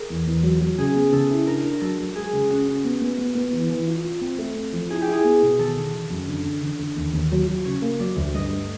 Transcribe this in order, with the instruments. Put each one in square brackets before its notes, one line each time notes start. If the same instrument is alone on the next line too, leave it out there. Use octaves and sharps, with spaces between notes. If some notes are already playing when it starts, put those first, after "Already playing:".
Already playing: [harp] G#4 A#4
[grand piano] E2
E2
F#3
F#3
[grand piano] C#3 [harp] G#4
[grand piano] B3
[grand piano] C#3 [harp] A4
[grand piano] E4
[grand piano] D4 [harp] A#4
[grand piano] D4
[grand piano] F#3 [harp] A4
[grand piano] F#3
[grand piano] G#3 [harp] G#4
[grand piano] C#3
[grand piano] C#4 [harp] F#4
[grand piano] C#4
B3
B3
B3
B3
E3
E3
F4
F4
C4
A3
C4
F3
[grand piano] E4 [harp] G#4
[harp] G4
[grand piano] E4 [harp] G#4
[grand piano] B3
B2
[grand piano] D#3 [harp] A4
[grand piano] D#3
D#3
F#2
D3
D3
D3
D3
D#2
D#2
F#3
F#3
[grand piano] C#3 [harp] C#5
[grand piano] A#3
[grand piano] F#3 [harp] D5
[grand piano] D2
[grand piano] G2 [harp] D#5
[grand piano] A3